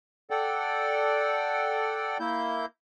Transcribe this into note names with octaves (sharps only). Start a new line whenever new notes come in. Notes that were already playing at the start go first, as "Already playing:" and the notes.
A4 D5 F#5 G5
A#3 E4 G6